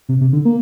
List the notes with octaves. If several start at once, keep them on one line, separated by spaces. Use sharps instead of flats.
C3
C3
D3
A#3